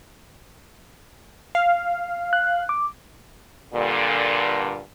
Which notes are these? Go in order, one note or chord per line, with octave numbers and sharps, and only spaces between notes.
F5
F#6
D6
G2 A#2 D3